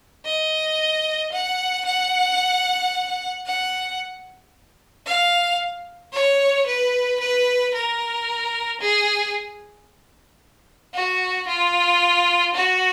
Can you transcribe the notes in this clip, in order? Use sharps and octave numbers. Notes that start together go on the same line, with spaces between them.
D#5
F#5
F#5
F#5
F5
C#5
B4
B4
A#4
G#4
F#4
F4
F#4